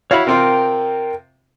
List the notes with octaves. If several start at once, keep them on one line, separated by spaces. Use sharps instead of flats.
E4 F#4 C#5 F5 B5
C3 C4 F4 A#4 G5